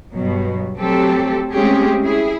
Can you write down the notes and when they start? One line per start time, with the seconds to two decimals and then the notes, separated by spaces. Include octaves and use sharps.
0.13 G2 B2 F#3
0.78 F#3 A3 C4 G4 A4
1.52 G#3 A3 C4 C#4 G4 G#4
2.04 E4 G#4